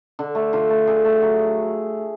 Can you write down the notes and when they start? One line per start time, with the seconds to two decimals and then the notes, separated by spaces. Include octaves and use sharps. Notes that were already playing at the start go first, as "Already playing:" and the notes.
0.19 D3
0.35 A3
0.53 D3 F4
0.70 A3
0.87 D3 G#4
1.05 A3
1.22 F#3 F#4